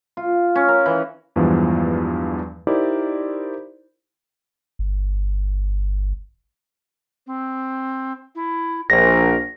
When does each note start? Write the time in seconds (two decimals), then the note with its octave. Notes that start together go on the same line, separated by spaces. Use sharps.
0.17 F4
0.55 C#4
0.68 A#4
0.86 E3
1.36 E2 G2 E3 F3 G#3 B3
2.67 D#4 E4 G4 A#4 C5 D5
4.79 G1
7.26 C4
8.35 E4
8.90 A#1 A#4 A#6